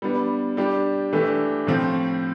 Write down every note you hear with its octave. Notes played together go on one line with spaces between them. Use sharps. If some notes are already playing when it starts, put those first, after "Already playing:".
G3 B3 D4
G3 D4 G4
E3 A3 D4 G4
A2 F3 C4